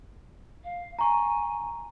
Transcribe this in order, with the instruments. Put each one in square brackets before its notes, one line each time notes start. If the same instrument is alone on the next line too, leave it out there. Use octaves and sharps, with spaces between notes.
[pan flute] F5
[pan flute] G#5 [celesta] A#5 C#6